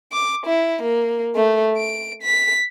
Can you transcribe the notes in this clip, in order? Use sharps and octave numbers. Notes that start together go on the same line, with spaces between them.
D6
E4
A#3
A3
D7
B6